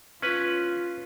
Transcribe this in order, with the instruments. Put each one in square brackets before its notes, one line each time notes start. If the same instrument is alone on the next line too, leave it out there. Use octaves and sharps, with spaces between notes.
[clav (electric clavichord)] C#4 B4 [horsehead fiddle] F4